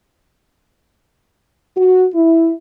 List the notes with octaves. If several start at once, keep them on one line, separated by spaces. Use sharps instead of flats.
F#4
E4